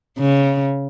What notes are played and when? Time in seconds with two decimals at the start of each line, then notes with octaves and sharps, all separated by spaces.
0.18 C#3